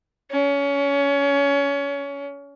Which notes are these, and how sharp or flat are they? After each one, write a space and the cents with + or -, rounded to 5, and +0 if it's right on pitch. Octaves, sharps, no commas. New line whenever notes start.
C#4 +25